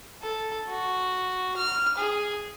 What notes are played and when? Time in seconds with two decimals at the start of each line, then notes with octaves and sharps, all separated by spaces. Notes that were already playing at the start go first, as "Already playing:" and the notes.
0.23 A4
0.69 F#4
1.56 F6
1.97 G#4